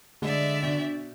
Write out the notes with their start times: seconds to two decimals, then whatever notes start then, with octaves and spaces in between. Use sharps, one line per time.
0.22 D3 G#3 D5 E5
0.63 B2 D4